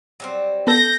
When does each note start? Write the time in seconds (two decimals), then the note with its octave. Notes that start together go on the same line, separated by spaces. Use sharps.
0.20 F#3 G3 C4
0.67 B3 A4 G6 A#6